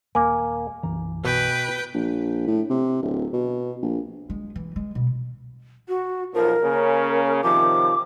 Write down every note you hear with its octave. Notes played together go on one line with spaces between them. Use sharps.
D#1 A#3 G#5 D6
B1 F#2 E3 A#5
B2 B4 G5
A#1
A2
C3
D1
B2
A#1
G#3
E3
G#3
B2
F#4
B1 F3 A#4
C#3 A#3 C#4
C3 D#3 F3 D6